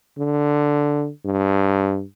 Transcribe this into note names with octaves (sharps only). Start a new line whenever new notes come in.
D3
G2